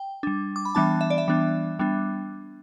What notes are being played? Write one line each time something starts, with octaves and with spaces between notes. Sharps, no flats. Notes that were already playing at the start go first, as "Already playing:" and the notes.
Already playing: G5
G3 D4
D6
B5
E3 G3 B3 D4 A5
E5
D5
E5
E3 G3 B3 D4
G3 B3 D4